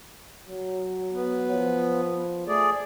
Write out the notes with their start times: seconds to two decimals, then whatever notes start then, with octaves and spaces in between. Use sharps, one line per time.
0.48 F#3
1.13 B3
1.51 F3
2.48 A3 G#4 D5